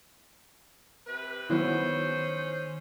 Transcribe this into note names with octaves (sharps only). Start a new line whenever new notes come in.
C3 B4
D#3 F#3 G#3 B3 C#4 E4 C5